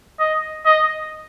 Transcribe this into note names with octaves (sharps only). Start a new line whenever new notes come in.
D#5
D#5